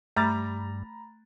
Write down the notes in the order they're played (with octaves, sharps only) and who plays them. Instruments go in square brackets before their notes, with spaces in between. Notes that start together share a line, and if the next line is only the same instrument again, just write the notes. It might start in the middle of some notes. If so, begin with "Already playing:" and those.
[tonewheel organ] G2 [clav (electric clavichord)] G3 [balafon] A3 [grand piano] A#5 B5 A6